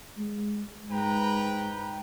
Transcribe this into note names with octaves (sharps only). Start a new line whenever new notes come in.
G#3
G#2 B4 G5 A#5